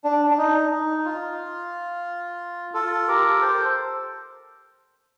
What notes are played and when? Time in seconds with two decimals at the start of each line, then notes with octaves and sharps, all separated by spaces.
0.04 D4
0.30 D4
0.38 D#4
0.71 D#4
1.05 F4
2.74 F4 A4
3.08 G4 A#4
3.41 A4 C5